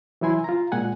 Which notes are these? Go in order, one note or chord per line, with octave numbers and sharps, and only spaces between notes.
E3 F#3 E4 G#5 C6
F4 A#5
A#2 G#3 F#5 G#5